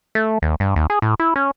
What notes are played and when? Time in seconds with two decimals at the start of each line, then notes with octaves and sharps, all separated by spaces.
0.15 A3
0.42 D#2
0.60 G2
0.76 D#2
0.90 G#4
1.02 A2
1.20 E4
1.36 C#4